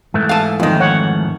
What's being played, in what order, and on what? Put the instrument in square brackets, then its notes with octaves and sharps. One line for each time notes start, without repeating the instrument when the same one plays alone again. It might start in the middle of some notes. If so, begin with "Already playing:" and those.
[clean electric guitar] G#2 E3 A3
[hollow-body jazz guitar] F5 A5
[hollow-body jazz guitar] F2 D#3 [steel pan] F4 D#5
[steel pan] C#5 F#5